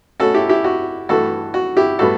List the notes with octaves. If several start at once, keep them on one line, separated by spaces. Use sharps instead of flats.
B2 A3 C#4 F#4 A4
E4 G4
E4 G4
F#4
G2 E3 A3 F#4 A4
F#4
E4 G4
A2 G3 B3 F#4 A4